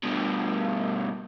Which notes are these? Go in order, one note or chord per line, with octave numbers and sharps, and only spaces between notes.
G2 B2